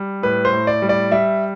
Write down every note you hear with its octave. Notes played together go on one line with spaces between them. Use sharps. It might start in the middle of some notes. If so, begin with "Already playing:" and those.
Already playing: G3
A2 B4
C5
A2
D5
G3
D5
G3 E5